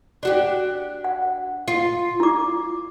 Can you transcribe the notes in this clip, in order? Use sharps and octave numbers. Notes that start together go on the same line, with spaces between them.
D4 F#4 G4
F#5
F4
E4 D6